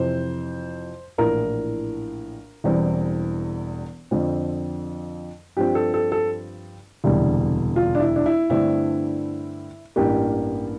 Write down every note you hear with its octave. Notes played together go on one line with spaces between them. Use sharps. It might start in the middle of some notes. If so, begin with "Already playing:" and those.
Already playing: F2 C3 E3 C5
A#1 A2 E3 A#4
E1 E2 E3 G3 C4
F2 D3 F3 C4
G2 F3 C4 G4
A4
A4
A4
E1 D2 C3 E3 G3
F4
D4
E4
D4
E4
G2 D3 A3 C4 E4
A1 G2 E3 A#3 G4